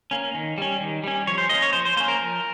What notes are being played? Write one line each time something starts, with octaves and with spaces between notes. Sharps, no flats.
A#3 C#4
D#3
G3 C#4
D#3
G3 C#4
F3 C#5
C5
A#3 C#4 D#5
C#5
F3 C5
C5
A#3 C#4 C5
A#4
F3